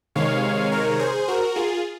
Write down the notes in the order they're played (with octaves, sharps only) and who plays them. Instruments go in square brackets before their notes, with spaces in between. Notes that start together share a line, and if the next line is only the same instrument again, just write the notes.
[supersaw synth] C3 D#3 G#3 C#5 F5
A#4 C#5
G#4 C5
F#4 A#4
F4 G#4